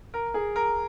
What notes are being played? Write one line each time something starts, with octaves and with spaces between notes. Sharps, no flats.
A#4
G#4
A#4